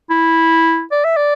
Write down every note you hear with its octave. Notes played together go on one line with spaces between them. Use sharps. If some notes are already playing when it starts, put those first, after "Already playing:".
E4
D5
E5
D5